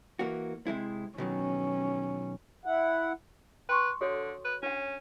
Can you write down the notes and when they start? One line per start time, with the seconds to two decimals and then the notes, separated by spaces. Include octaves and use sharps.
0.19 E3 A#3 F#4
0.67 C3 G#3 E4
1.18 B2 D#3 F#3 C#4
2.65 E4 F#5
3.69 B4 G5 C6 C#6
4.01 D3 F#4 A4 C#5
4.45 B4
4.63 C#4 D4 F#5